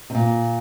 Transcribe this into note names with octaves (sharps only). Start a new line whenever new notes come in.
C3
A#2